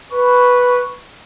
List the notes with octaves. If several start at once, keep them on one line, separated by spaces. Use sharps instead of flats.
B4 C#6